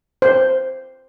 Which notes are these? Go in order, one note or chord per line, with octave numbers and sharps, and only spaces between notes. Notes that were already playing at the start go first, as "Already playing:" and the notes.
C5